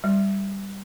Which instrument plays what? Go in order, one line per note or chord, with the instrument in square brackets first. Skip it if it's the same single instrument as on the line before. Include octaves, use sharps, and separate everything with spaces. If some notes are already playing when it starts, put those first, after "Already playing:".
[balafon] G3